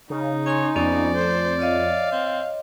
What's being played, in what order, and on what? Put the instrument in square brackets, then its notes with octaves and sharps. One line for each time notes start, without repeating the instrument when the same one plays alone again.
[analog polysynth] C#3 [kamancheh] D#4
[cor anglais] C#5 [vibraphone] G#5 C6
[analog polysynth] F2 [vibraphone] B3 C#4 G#5 [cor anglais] D5
[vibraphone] A3 [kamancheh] C5
[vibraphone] C#5 D#5 [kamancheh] F5
[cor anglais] C4